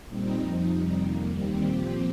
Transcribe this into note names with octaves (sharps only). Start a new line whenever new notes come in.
A#2 G3 C4 D#4
F2 F3 D#4
F2 C3 G3 D#4
F2 D#3 A#3
D#2 D#3 G3 C4
A#2 F3 C4 G4